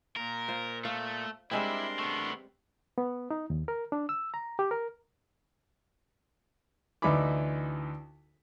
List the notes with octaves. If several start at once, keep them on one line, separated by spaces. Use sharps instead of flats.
A#2 A#4
F4 C5
A3 F5
G3 G#3 C4 D4 E4 A#4 E5 C6
A3 B3
B3
D#4
D#2
A#4
D4
E6
A#5
G4
A#4
D2 E3 D#4 E4 B5 D6